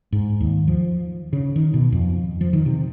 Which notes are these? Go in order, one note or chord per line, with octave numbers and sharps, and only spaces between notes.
G#2
D#2
F3
C#3
D#3
B2
F2
F3
D#3
C3